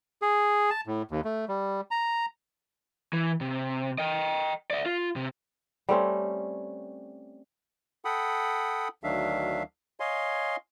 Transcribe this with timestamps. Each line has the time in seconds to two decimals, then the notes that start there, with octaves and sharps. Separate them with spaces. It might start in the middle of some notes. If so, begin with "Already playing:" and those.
0.22 G#4
0.70 A5
0.87 A2
1.11 D#2
1.25 A3
1.48 G3
1.91 A#5
3.13 E3
3.41 C3
3.98 D#5 G5
4.71 D5 E5
4.86 F4
5.16 C3
5.89 G3 A3 C4 C#4
8.05 A4 F#5 G5 B5 D#6
9.04 D2 D#3 F#3 D4 E5 F5
10.00 C#5 D#5 F5 G#5 C6